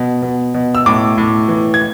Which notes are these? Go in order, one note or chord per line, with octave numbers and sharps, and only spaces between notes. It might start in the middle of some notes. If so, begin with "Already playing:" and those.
Already playing: B2
B2
B2
E6
A2 D6
A2
E3
G#6